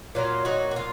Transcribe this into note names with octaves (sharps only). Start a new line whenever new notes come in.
A#2 F#3 A#3 F4
D#4 F#4
F#4
F4